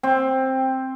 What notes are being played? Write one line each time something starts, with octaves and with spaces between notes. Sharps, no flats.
C4